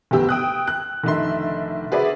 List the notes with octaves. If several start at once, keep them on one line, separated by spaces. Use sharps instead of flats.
F1 D2 B3 G4 E6
G5 D#6 F#6
F#6
F1 D3 D#3 D4 E5 C6
F#4 G#4 B4 C5 D5 E5